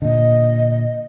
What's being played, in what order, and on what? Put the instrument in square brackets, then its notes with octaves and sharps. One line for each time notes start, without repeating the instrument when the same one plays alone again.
[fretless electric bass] A#2 D3 [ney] D#5